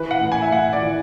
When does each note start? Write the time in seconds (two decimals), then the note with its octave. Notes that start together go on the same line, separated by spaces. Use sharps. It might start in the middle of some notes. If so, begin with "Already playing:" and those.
Already playing: E3 B4
0.11 F#5
0.21 A2
0.32 G#5
0.42 E5
0.51 A2 F#5
0.73 D5
0.83 E3